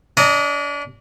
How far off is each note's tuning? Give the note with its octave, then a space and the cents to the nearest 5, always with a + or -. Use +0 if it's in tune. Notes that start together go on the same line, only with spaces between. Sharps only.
D4 -35 D#5 +0 A#5 -20